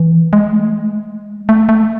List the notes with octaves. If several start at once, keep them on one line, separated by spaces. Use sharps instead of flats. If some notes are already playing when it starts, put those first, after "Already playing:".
Already playing: E3
G#3
A3
G#3
A3
A3